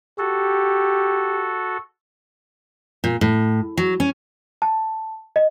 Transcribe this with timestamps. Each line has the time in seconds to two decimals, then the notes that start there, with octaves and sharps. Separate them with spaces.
0.19 F#4 G4 A4
3.04 A#2
3.21 A2
3.77 F#3
4.00 C#4
4.62 A5
5.36 D#5